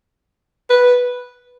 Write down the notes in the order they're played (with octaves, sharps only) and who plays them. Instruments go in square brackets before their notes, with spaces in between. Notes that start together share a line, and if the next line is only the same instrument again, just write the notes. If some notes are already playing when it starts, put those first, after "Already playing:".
[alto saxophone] B4